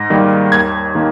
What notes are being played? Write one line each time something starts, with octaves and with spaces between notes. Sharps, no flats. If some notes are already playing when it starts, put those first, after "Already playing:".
Already playing: G#2 A#6
D#3 G3 A#3
D#2 G#6
D#3 A#3